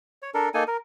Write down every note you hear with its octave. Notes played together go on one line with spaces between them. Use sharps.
C#5
D4 A4 A#4
A#3 D#4 A4 G#5
A#4